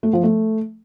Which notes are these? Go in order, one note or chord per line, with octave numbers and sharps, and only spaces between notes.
A3
F3
A3